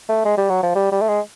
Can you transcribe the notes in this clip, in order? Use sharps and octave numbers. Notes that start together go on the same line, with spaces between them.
A3
G#3
G3
F#3
F3
G3
G3
A3
G#3